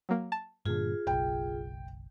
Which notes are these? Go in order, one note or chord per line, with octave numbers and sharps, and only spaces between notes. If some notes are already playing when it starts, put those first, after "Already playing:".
F#3 A#3
A5
G2 A#2 D3 F4 G#4
F#1 B1 G5